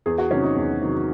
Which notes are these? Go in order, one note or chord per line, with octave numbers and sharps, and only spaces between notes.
E2 G#4
F#4
C3 D#3 F#3 C#4
D#4
E2
C3 D#3 F#3